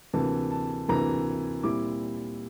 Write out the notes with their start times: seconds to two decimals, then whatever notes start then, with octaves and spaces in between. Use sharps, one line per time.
0.14 D2 C3 E3 A#3 A5
0.51 A5
0.88 D2 C3 E3 A#3 A#5
1.63 A#2 G3 C4 E4 D6